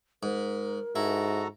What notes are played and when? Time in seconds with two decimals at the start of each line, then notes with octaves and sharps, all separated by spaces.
0.23 G#2 A#4
0.96 G#2 E4 F#4 A4 A#5